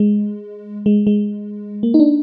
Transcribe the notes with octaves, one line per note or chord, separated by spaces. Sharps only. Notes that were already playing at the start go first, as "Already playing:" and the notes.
Already playing: G#3
G#3
G#3
A#3
D#4
D4